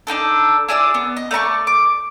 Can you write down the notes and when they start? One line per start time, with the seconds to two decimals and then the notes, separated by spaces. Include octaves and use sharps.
0.07 D4 D#4 G4 A4
0.68 E4 G#4 D5 E6
0.94 B3
1.17 D#5
1.31 A3 D5 A#5 C#6
1.67 D6